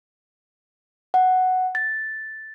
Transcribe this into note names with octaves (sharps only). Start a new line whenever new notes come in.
F#5
A6